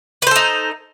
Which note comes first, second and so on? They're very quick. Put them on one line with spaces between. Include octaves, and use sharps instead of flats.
B4 C5 A4 D#4